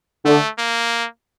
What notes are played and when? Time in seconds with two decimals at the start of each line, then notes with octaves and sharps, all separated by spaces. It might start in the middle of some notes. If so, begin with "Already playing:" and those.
0.25 D3 A3
0.59 A#3